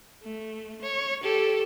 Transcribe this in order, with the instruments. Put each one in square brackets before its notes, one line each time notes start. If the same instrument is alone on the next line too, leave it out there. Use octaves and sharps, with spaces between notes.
[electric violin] A3
C#5
G4 A4